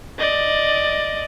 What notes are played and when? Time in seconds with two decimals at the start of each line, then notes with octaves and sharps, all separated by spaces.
0.18 D5 D#5